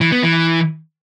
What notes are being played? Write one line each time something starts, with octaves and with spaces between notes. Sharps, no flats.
E3
B3
E3